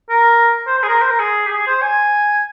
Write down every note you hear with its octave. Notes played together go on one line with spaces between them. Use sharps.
A#4
C5
C5
G#4
A#4
C5
A#4
G#4
G4
G#4
C5
G#5